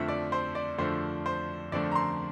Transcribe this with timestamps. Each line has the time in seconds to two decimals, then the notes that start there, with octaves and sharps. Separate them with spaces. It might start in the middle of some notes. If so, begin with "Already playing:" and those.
Already playing: F2 D3 F3 A3 E5
0.08 D5
0.32 C5
0.55 D5
0.78 F2 D3 F3 A3 C5
1.26 C5
1.72 F2 D3 F3 A3 D5
1.92 A#5
1.95 C6